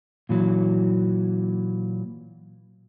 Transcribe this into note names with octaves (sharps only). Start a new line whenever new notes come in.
A#2 E3 F#3